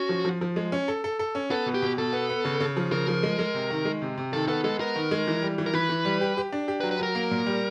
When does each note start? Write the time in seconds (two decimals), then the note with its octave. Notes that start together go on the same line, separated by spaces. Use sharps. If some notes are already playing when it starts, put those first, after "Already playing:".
Already playing: C#4 F#4
0.09 F3
0.25 F3
0.41 F3
0.56 G#3
0.72 C#4
0.88 A4
1.04 A4
1.19 A4
1.35 C#4
1.51 B3 A4
1.66 B2
1.74 G4
1.82 B2
1.98 B2 A4
2.13 B3
2.29 B3
2.45 C#3
2.60 C#3
2.77 F3
2.92 C#3 A#4
3.08 F3
3.23 G#3
3.39 G#3
3.54 C3
3.70 D#3
3.85 G#3
4.02 C3
4.18 C3
4.33 D#3 A4
4.48 B3 A4
4.64 G#3 A4
4.80 B3 A#4
4.96 D#3
5.11 G#3
5.28 E3
5.42 G3
5.58 E3
5.66 A#4
5.74 E3 B4
5.89 E3
6.05 G3
6.21 G4
6.37 G4
6.53 D4
6.68 G4
6.80 B4
6.83 F#3
6.91 B4
6.99 F#3 A#4
7.15 A#3
7.31 A#2
7.46 G3